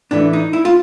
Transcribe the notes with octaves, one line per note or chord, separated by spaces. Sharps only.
A2 E3 A3 D4
D#4
E4
F4